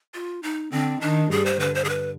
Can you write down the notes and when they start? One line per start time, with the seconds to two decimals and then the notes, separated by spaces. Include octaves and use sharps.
0.14 F4
0.43 D#4
0.71 D3 C4 D4
1.01 D#3 D4 D#4
1.30 G2 G3 G#4
1.46 C5
1.60 D3 B4
1.75 C5
1.84 G#4
1.89 B4